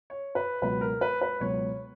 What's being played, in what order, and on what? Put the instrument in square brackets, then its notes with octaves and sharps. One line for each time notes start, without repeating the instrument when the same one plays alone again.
[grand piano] C#5
B4
C#2 B2 F#3 B4
A#4
B4
B4
C#2 B2 F#3 C#5